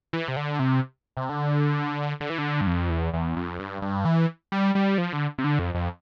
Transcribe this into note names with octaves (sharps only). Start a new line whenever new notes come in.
E3
C3
D3
C3
C3
D3
D3
E3
D3
G2
F2
E2
E2
F2
G2
G2
E3
G3
G3
F3
D3
C3
D3
F2
F2